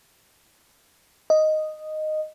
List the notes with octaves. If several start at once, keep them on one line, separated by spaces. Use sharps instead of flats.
D#5